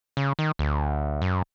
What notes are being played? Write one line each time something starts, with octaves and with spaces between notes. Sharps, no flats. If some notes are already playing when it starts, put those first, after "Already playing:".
C#3
D#3
D2
F#2